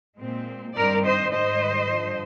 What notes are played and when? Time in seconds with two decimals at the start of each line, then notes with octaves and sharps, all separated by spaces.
0.18 A#2 G#3 C4
0.75 G2 D#3 G3 C4 A#4 D5
1.04 C5 D#5
1.33 G#2 D#3 G3 C5 D#5
1.91 G2 D3 F3